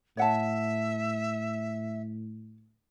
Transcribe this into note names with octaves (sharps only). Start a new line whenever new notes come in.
A2 C#5 E5 F#5 A5